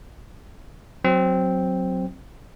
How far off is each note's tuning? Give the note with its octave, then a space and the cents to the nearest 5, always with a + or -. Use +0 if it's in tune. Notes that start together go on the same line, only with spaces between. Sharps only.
F#3 +0 C4 +0